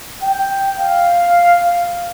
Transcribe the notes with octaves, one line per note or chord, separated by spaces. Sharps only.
G5
F5